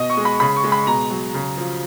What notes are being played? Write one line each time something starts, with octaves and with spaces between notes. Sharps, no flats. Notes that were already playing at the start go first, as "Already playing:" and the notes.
Already playing: B2 D#5
C#6
G#3
B5
C#3 B5
C#6
G#3
B5
B2 A#5
F#3
C#3
F3